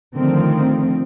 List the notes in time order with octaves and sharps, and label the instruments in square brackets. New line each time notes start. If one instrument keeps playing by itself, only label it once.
[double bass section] D3 D#3 F3 A3 C4